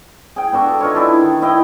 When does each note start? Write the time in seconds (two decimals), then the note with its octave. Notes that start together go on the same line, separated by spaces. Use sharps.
0.36 G#4 G5
0.52 B3 D4 F#4 A4
0.80 D#4 F4 C#5
0.95 D4 E4 G#5
1.21 D#3
1.42 E4 D#5 G5